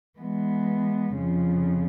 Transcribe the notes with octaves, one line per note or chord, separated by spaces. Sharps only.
E3 G#3 B3
F2 C#3 F3